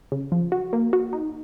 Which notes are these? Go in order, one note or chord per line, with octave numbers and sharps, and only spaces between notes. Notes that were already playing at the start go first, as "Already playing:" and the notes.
C#3
F3
F#4
A#3
F#4
D#4